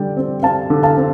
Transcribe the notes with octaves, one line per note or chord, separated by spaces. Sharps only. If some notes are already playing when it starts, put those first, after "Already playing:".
Already playing: D3 G3 D5 G5
C4
C4 F5 A5
D3
F5 A5
C4